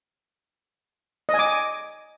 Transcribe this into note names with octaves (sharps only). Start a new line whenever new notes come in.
D#5
G#5
D6